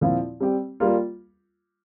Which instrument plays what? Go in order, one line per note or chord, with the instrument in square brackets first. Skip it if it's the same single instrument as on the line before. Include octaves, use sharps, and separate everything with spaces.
[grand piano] A#2 F3 C4 E4
G3 C4 G4
G3 A#3 F4